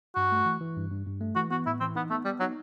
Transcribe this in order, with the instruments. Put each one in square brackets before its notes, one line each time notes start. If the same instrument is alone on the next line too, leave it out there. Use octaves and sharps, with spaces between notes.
[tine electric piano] G2 [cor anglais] F#4
[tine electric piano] A3
E3
E3
G2
G2
G2
A3
[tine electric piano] E3 [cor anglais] F#4
[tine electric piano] B3 [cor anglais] F#4
[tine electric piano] A2 [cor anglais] E4
[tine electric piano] E3 [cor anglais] C4
[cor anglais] B3 [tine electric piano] D#4
[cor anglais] A3 [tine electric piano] B3
[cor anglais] G3 [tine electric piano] B3
[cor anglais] F#3 [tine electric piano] D#4